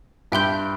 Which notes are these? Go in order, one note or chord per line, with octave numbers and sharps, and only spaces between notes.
G2 E5 G5 C6 G6